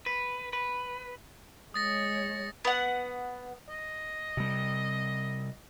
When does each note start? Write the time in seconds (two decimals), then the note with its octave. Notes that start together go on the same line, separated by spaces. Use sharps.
0.06 B4
0.53 B4
1.74 G#3 C#5 D#6 A6 A#6
2.65 B3 F#5
3.69 D#5
4.37 C3 G3